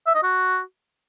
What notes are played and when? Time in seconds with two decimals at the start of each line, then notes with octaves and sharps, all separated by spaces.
0.07 E5
0.15 D#5
0.23 F#4